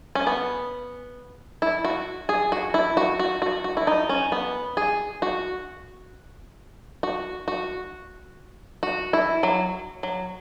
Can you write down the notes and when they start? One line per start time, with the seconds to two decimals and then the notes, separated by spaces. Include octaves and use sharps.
0.15 C#4
0.27 B3
1.62 E4
1.85 F#4
2.29 G#4
2.52 F#4
2.74 E4
2.97 F#4
3.19 F#4
3.42 F#4
3.64 F#4
3.77 E4
3.87 D#4
4.09 C#4
4.32 B3
4.77 G#4
5.22 F#4
7.03 F#4
7.48 F#4
8.83 F#4
9.13 E4
9.43 F#3
10.03 F#3